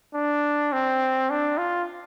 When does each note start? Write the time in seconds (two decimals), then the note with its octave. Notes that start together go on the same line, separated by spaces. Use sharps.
0.14 D4
0.72 C4
1.30 D4
1.58 F4